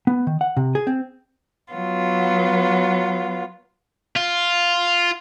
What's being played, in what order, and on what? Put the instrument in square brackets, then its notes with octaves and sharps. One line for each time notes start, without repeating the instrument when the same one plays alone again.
[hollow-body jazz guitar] B3
D#3
F#5
C3
G#4
C4
[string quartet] F#3 B3 F4
[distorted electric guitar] F4